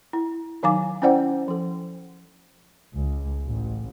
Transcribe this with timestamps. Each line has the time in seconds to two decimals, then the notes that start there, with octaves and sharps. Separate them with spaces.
0.13 E4
0.63 D#3 F#3 D#4 F5 G#5 D6
1.02 C#4 E4 C5 D5 F#5 G5
1.48 F3 A4
2.93 C#2
3.46 A1